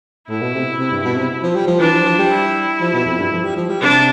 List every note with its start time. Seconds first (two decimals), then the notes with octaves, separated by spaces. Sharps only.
0.29 A2 E4
0.41 B2
0.54 C3
0.79 C3
0.92 G2
1.05 B2
1.17 C3
1.43 F3
1.55 G3
1.67 F3
1.80 E3 D4
1.93 F3
2.05 F3
2.19 G3
2.31 E4
2.81 F3
2.93 B2
3.06 F2
3.19 G2
3.32 F3
3.44 G3
3.56 F3
3.69 G3
3.81 C3 D4